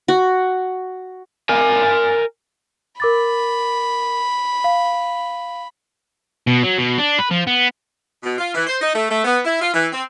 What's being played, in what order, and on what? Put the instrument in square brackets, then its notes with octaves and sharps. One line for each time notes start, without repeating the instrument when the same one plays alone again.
[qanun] F#4
[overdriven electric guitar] A#4 G#5
[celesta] A#4 D6 A6 [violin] B5
[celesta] F5
[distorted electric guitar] B2
F#3
B2
D4
B4
F3
B3
[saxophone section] B2
F4
E3
C5
D#4
A3
A3
B3
E4
F4
E3
C4